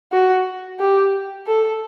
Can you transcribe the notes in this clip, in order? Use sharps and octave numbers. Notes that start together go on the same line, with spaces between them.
F#4
G4
A4